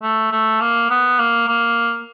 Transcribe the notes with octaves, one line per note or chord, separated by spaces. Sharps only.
A3
A3
A#3
B3
A#3
A#3